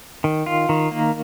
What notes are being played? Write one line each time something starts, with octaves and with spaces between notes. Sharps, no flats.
D#3
F4
D#3
A#3